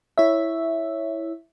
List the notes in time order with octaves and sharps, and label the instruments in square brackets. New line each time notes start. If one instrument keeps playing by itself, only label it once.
[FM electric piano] E4 C#5 E5